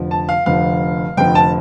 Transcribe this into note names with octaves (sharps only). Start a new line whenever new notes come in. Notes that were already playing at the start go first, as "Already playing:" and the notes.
Already playing: F1 F2 D3 F3
A5
F5
F1 F2 D3 F3 F5
F1 F2 D3 F3 G5
A5